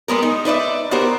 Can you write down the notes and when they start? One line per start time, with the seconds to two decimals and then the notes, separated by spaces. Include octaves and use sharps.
0.08 G3 G#3 B3 A#4
0.23 D#4
0.45 D#4 B4 D5 E5
0.91 B3 D#4 F#4 G4 A#4 C5